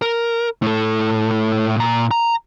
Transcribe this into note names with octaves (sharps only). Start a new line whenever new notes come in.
A#4
A2 A4
A#2 A#5
A#5